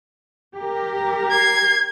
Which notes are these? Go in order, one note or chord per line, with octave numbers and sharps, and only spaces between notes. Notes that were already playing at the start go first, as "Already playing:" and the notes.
G4 A#4
G#6 C7